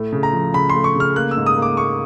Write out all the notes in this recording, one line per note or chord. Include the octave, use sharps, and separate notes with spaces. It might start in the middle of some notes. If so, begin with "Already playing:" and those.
Already playing: A2 A3
C#3
A#5
F3
C#3 B5
C6
A3
C#6
C#3 F6
A#3 F#6
E6
G#2
D#6
A#3
D6
A#3 C#6